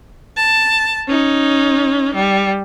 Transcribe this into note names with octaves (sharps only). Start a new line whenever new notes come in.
A5
C#4 D#4
G3